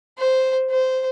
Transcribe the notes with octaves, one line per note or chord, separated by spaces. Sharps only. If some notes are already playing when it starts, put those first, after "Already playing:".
C5
C5